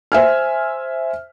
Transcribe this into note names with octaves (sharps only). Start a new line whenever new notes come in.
C5 E5 G#5 F6